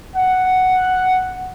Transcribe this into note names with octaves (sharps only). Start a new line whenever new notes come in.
F#5